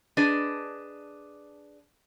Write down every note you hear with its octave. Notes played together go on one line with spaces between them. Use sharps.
D4 G#4 B4 D#5